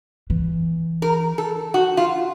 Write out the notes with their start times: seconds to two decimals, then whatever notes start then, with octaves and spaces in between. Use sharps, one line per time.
0.30 E3
1.02 A#4
1.38 A4
1.74 F#4
1.97 F4